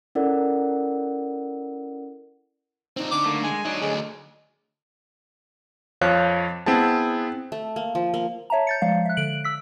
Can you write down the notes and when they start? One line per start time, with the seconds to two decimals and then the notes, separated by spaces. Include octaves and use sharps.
0.15 C#4 E4 A4 A#4 D5 F#5
2.97 A#2 C4 D#4
3.12 D3 D6
3.26 A3 A#3
3.44 G#3 G#5
3.65 F#3 D4 D#4
3.82 D2 G#4 D#5
6.01 F2 F3 C#5 F5 F#6
6.66 B3 C4 E4 G#4 A5
7.52 A3
7.76 A#3
7.95 F3
8.14 A#3
8.50 C#5 E5 A5 A#5
8.67 G6 A6 C#7
8.82 F3 G#3 D5 F5
9.06 E5 F#6
9.17 D3 D7 F#7
9.44 E6 B6